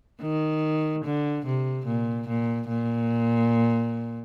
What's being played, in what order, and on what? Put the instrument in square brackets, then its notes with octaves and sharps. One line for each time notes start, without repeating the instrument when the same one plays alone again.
[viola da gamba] D#3
D3
C3
A#2
A#2
A#2